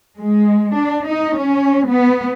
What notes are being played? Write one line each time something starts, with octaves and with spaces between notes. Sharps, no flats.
G#3
D4
D#4
C#4
B3